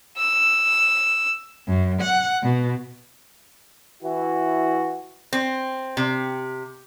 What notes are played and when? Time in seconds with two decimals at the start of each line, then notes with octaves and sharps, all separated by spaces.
0.17 E6
1.67 F#2
2.01 F#5
2.43 B2
4.03 E3 E4 F#4
5.33 C4
5.97 C3